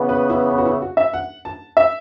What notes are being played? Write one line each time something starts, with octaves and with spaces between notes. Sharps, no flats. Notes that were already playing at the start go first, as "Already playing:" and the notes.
Already playing: C#3 E3 B3
B4
E4
C#4
F#4
E4
F#4
E5
F#5
A5
E5